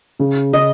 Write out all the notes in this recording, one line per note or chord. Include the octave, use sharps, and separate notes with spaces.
C#3
C#3 D#5